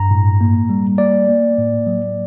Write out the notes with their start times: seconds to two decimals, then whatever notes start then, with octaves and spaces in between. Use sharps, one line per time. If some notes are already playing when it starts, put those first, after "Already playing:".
Already playing: G2 A#5
0.11 A2
0.41 A#3
0.70 G3
0.98 A#3 D5
1.29 A#3
1.58 A2
1.87 F#3